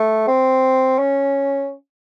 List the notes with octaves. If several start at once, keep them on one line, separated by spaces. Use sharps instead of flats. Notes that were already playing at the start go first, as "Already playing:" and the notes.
Already playing: A3
C4
C#4